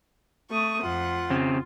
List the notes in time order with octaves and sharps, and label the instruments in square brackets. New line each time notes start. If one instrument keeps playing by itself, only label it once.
[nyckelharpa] A3 D#6 [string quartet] C#6
[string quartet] F2 F#5 [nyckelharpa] F4
[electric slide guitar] C#3 C4